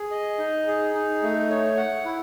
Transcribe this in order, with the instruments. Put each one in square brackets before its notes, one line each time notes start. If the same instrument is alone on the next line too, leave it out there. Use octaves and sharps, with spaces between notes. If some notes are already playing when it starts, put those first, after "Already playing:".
Already playing: [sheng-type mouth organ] G#4
D#5
D#4
G#4
D#4
A3
C#5
F#5
E4